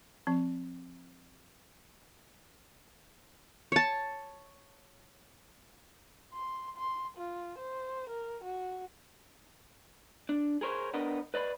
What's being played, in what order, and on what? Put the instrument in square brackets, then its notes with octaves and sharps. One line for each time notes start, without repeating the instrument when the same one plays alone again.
[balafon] F3 C4
[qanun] C#5 A5
[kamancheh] C6
C6
F4
C5
A#4
F#4
[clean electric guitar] D4
G#4 A#4 C5 C#5
B3 D4 A#4 D#5
B4 D5 D#5 B5